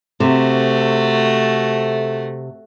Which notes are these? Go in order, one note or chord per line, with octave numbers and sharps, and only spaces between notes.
C3 A3 F#4